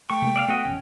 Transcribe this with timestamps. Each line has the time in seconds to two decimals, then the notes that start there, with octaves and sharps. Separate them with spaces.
0.10 A3 G5 C#6
0.22 C3 G#3 A#3
0.36 D5 E5 F5
0.48 A3 B3 F#4 D#5
0.65 E1 A1 C#4